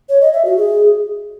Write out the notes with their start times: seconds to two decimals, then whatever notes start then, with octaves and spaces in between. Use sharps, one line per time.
0.09 C#5
0.21 D#5
0.33 E5
0.45 F#4
0.57 G#4